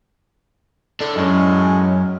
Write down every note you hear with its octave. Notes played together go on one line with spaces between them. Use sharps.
A2 D3 D4 A4
F#2 A2 F#3 G#3 C#4